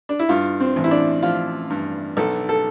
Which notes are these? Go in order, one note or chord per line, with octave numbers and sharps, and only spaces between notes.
D4
E4
G2 F4
C4
A1
E4
D4
F3 F4
G2
B1 A4
A4